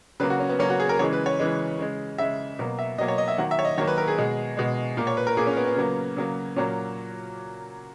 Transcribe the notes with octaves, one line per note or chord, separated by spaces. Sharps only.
C#3 F#3 A#3 B4
F#4
C#4
B3
C#3 F#3 A#3 C#4
F#4
G#4
A#4
C#3 E3 G#3 C#5
B4
C#5
C#3 E3 G#3
C#3 G#3
C#3 G#3 E5
B2 F#3 A#3
E5
B2 F#3 A#3 D#5
C#5
D#5
E5
D#3 F#3 A#3 F#5
E5
C#5
D#5
D#3 F#3 A#3 C#5
B4
A#4
G#4
B2 G#3
B2 G#3
A#2 A#3
C#5
B4
A#4
A#2 A#3 G#4
C#4
B3
B3
C#3 F#3 A#3
C#3 F#3 A#3
A#2 F#3 A#3 C#4